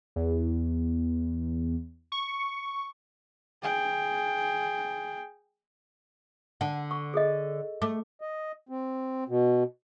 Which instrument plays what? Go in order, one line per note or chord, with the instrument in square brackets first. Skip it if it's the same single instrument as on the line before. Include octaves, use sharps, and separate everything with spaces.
[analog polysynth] E2
C#6
[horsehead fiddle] G#4 G5
[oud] D3 [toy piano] F#5 A5
[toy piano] C#6
G#4 A4 D#5
[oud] A3 [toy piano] D6
[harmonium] D#5
C4
B2